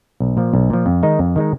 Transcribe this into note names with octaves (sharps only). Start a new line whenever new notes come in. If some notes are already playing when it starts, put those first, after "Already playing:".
B1
A#2 F3
B1
A#2 F3
F2
D#3 G#3 D#4
F2
D#3 G#3 D#4